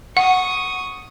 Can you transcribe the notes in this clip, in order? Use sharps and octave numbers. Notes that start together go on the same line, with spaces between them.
F#5 C#6 D#6